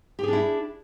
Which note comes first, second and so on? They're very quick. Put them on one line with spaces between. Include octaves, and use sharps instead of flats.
G4 G#4 D4 E4